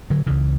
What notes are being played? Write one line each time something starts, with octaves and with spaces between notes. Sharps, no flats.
D3 F#3
C#2 C#3 E3